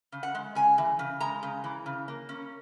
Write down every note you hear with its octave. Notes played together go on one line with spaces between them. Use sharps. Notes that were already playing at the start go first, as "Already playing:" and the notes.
C#3
F#5
G#3
C#3 G#5
E3
C#3
G#3 A#5
C#3
E3
C#3
A#3
C#4